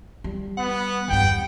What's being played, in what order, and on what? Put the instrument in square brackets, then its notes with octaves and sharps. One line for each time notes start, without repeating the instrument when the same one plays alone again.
[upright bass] G3
[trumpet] B3 [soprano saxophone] F#5
[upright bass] E2 G2 [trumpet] G5